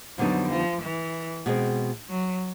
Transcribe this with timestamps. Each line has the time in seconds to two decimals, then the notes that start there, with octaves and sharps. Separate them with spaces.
0.18 F2 D3 F#3 G3 B3 D#4
0.50 F3
0.82 E3
1.46 B2 G#3 C4
2.09 F#3